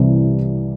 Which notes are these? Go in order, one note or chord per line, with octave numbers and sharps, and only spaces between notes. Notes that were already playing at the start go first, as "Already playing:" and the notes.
Already playing: C2 C3 E3 G3